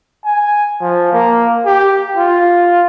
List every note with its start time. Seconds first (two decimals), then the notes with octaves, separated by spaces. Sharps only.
0.25 G#5
0.81 F3
1.13 A#3
1.66 G4
2.16 F4